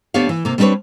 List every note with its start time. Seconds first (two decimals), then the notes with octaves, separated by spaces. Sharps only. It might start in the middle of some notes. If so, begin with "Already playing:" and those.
0.14 D2 B3 D4 G4 C#5 F5
0.29 E3
0.45 C3 A#3
0.58 G3 C4 D4 F4 B4 C#5